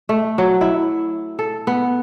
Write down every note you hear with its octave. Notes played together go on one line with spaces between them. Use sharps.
A3
F#3
E4
A4
B3